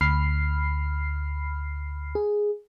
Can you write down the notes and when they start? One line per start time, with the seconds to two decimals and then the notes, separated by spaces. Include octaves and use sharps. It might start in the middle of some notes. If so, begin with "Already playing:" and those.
0.01 D2 B5 F6 C7
2.15 G#4